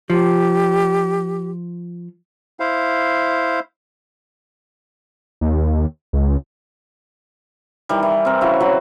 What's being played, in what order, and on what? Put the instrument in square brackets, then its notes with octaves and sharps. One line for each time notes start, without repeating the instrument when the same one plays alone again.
[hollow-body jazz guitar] F3 [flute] G4
[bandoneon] E4 C5 F5
[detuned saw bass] D#2
C#2
[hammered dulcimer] D#3 E3 G3
E3
C4 A#4
C#3 E4 F#4 C#6
F#3 F#4 B4 C5